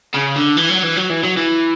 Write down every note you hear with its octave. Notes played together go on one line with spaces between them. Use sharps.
C#3
D3
E3
F#3
E3
F#3
E3
F#3
E3